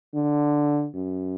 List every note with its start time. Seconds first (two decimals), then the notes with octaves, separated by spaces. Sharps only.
0.14 D3
0.95 F#2